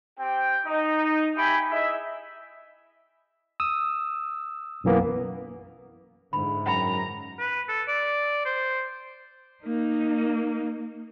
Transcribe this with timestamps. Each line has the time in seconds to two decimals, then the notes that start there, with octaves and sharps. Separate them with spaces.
0.19 C4 G4 G5
0.66 D#4
1.37 G4 E5 G5 G#5 B5
1.71 E4 G#4 D#5 E5
3.60 D#6 E6
4.84 B1 F#2 E3 A#3 B3
6.33 G#2 D3 E3 B5
6.66 F#2 F#5 G5 A#5 B5
7.39 B4
7.69 A4
7.88 D5
8.45 C5
9.65 A#3 D#4